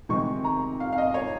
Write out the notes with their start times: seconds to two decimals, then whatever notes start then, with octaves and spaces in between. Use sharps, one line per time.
0.09 C3 D#3 G#3 C4 C#6
0.44 A#5
0.80 F5
0.93 F5
0.98 D#5
1.14 C#5